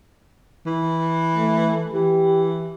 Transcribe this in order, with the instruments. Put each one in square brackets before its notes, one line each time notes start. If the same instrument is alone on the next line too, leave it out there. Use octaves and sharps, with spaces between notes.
[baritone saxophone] E3
[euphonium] A3
[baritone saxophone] E3 [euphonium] G4